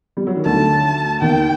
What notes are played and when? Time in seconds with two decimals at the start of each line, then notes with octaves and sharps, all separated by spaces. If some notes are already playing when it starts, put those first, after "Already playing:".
0.17 G3
0.27 F#3
0.36 D#3
0.45 D2 D3 A5
1.22 D#2 D#3 G5